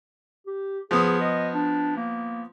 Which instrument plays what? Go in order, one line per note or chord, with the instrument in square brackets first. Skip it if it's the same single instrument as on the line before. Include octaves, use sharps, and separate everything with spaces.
[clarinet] G4
[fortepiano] F3 B3 D#6 [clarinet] G#4
[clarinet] D#5
D4
A#3